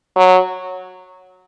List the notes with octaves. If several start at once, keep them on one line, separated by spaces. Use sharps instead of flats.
F#3